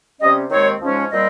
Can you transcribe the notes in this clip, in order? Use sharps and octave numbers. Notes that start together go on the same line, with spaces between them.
C3 G3 C#4 D#5
D#2 D#3 G#3 C4 C#5
G#2 F3 G#3 C#4
A#2 G3 C4 D#5